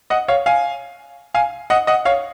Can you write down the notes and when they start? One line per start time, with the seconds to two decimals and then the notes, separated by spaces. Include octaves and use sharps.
0.10 D#5 F#5
0.28 C#5 F5
0.46 F5 G#5
1.35 F5 G#5
1.70 D#5 F#5
1.87 D#5 F#5
2.05 C#5 F5